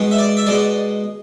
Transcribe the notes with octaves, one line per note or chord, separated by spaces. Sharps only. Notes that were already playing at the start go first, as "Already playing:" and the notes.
Already playing: B2 G#3
E5
D5
E5
B2 G#3 D5